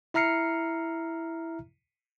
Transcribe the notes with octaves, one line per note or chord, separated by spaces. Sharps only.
E4 E5 A#5 F6 C7 C#7